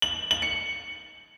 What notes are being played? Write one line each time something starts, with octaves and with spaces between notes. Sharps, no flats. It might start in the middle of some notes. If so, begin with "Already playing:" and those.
F#7
F#7
C#7